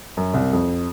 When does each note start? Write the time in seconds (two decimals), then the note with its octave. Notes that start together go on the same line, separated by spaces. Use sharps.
0.17 F#2
0.34 C2
0.53 F2